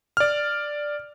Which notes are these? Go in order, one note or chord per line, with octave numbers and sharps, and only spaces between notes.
D5 F6